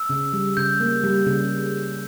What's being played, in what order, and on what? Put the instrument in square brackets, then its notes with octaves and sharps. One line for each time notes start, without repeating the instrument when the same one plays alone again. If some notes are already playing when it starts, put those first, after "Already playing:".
Already playing: [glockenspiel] E6
[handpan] C#3
G3
[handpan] C#3 [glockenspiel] G6
[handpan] A#3
G3
C#3